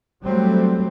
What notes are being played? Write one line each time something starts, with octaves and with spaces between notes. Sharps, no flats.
F#3 G3 A3 C4